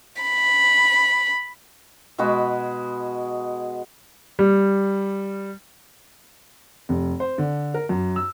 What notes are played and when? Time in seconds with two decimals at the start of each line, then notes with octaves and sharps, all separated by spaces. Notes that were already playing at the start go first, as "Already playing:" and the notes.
0.22 B5
2.18 B2 G#3 F#4 B5
4.39 G3
6.89 F1
7.20 C5
7.38 D3
7.74 A#4
7.89 F#2
8.16 E6